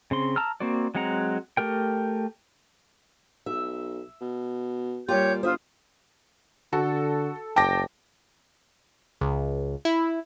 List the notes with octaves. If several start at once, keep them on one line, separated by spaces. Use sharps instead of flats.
C#3 C4 C6
A5 A#5 E6 F6
A#3 C4 F#4 D5
F#3 G#3 C4 F#5 A#5
A3 G4 A#4 G5
B1 E5
B2
A#2 G3 F4 G4 C#5 G6
G1 F4 C5 E5 D#6
D3 F#4 A4
F#1 G5 A5 D6 A#6
C#2
E4